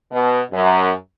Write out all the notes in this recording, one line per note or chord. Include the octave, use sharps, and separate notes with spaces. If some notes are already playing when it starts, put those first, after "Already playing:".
B2
F#2